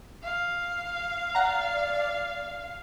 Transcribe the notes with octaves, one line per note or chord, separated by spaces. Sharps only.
F5
D5 F#5 A#5